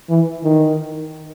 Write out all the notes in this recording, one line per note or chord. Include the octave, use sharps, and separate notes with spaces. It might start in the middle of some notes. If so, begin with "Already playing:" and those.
E3
D#3